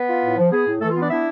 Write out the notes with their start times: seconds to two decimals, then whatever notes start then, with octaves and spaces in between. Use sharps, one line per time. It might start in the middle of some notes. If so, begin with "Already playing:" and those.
Already playing: B3 B4
0.08 F4
0.23 A2
0.37 F3
0.51 B3 G#4
0.66 A2
0.81 E3 A3 A4
0.91 F4
0.96 B3 D4 D5
1.10 D4 E4 E5